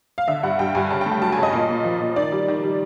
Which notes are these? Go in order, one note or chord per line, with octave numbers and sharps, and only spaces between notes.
F5
D3 E5
G2 F#5
G2 G5
G2 G#5
C#3 A5
G5
A3
G5
F#3 A5
G#5
C#3
D#5
A#2
A#2
F3
A#2
D#3 D5
G3
D#3
G3